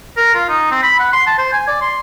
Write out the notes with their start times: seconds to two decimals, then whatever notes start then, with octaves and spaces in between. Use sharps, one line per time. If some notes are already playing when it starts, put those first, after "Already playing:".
0.17 A#4
0.35 F4
0.49 D#4
0.71 C4
0.83 B5
1.00 F#5
1.13 C6
1.27 A5
1.38 C5
1.52 G#5
1.68 D5
1.81 C6